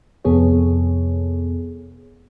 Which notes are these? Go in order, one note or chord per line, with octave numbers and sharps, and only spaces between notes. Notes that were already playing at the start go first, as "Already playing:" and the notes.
F2 C3 B3 G#4 A4 C#5